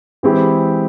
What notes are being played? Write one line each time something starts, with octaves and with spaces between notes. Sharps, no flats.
E3 G#3 C4 E4 G4